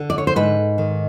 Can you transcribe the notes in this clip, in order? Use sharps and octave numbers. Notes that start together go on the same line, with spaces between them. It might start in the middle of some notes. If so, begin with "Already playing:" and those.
Already playing: D3
D5
C#5
C5
G#2 B4
D#3